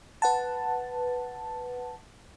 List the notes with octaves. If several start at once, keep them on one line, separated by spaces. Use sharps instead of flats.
B4 F#5 A5